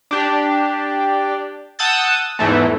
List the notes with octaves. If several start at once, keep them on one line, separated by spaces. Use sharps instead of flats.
D4 G4
F#5 A5 D#6 E6 G6 A6
E2 G#2 E3 A3